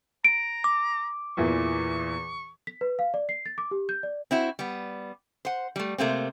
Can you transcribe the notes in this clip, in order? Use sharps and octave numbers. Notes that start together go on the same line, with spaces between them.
A#5 D7
D6
E2 A#2 E3 C#6
B6
B4
F5
D5
C7
A6
D6
G4
G6
D5
C4 E4 F#4
G3 B3
C5 F#5
G3 A3
C3 A3 A#3 C4